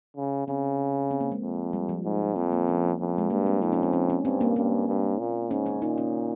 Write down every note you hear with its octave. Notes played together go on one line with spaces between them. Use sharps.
C#3
C#3 C4
C4
A#3
G#3
F2
G3
F3
G#2
F2 A#3
A#3
C#4
F2
G#3
G2 A#3
C4
F2 D#4
C#4
C4
C#4
C#4
G2 C4
A#3
G2 C#4
G2
A#2
G#2 C#4
D#4
A#2 D#4
C#4